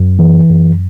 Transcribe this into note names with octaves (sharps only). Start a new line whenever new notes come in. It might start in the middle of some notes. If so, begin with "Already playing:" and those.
Already playing: F#2
E3
F#2